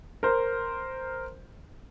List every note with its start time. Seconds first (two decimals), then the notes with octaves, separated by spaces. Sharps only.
0.23 A#4 C5